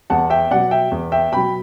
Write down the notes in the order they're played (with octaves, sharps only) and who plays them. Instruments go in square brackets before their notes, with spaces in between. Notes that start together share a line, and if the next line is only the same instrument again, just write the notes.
[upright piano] E2 F#5 A5
E5 G5
B2 F#3 D5 F#5
E5 G5
E2
E5 G5
B2 F#3 G5 B5